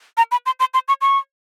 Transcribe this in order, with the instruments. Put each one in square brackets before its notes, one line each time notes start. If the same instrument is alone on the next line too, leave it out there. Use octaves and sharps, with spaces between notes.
[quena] A#5
B5
C6
C6
C6
C#6
C#6